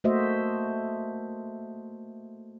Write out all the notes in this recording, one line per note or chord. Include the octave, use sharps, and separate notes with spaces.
A3 A#3 F#4 C5 D#5 E5